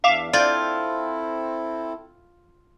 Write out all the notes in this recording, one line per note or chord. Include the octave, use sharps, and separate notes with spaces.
E2 D4 E5 F5 D6
C4 E4 F4 A4 D5 G6 G#6